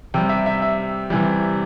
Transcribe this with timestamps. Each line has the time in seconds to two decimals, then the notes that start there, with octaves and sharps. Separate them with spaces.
0.14 C3 G3 G5
0.29 E5
0.46 E5
0.62 E5
1.10 C3 E3 G3